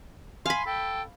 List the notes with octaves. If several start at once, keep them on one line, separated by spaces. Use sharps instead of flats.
F5 G#5 B5 C6
A4 G5